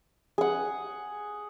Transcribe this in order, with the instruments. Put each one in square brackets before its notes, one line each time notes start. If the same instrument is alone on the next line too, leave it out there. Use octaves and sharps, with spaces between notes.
[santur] G#4 F#5